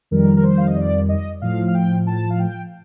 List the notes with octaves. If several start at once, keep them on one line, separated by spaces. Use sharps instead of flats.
F2 D#3 G3 A#4
A#4
C5
F5
D#5
D5
D#5
A2 F3 F5
F5
G5
A5
F5
G5